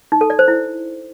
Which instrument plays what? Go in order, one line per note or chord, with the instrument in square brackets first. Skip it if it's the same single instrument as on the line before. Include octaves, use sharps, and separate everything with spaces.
[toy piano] D#4
A4
D5
C5
E4